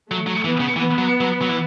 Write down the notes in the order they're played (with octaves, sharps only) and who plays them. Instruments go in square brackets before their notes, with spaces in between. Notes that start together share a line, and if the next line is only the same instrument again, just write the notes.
[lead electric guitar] F#3 [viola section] A3
[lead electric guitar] F#3
[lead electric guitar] E3 [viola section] B3
[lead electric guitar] C#3
[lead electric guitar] E3 [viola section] B3
[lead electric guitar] F#3
F#3
F#3
E3